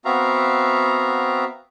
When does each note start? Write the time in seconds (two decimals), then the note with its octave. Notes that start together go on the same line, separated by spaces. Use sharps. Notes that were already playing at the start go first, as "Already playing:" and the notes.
0.05 B3 C4 F#4 E5 F5 A#5